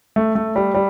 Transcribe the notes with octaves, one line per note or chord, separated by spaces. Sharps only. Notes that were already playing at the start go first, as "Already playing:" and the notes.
A3
A3
G3
G3